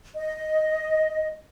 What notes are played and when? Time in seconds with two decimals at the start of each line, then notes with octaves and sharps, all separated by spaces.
0.15 D#5